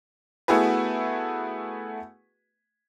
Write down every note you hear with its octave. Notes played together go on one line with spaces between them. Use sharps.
A3 B3 E4 F#4 G#4 B4